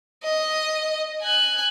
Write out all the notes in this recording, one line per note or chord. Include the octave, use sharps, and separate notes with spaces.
D#5
G#5 F#6